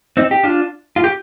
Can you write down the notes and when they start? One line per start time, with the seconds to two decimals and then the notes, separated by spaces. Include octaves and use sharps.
0.17 C4 D#4
0.31 G4
0.43 D4 F4
0.96 F4
1.04 G4